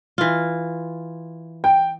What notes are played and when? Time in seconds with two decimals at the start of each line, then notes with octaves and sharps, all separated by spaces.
0.18 E3 F4
1.64 G5